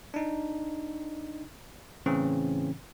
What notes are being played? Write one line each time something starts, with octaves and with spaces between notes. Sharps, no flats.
D4 D#4
A2 C#3 E3 C4 C#4